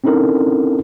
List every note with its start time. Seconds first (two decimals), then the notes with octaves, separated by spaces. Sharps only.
0.04 C4 C#4 D#4 E4 A4 A#4